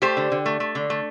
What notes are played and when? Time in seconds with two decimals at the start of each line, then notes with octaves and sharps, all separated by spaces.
0.02 A3 G4 C5
0.17 D3
0.32 D3
0.46 A3
0.60 A3
0.75 D3
0.90 A3